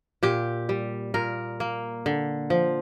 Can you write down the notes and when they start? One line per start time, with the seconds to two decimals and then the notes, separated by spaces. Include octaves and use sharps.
0.23 A#2 G4
0.69 G3
1.14 A#2 A#4
1.60 A#3
2.06 D3
2.50 F3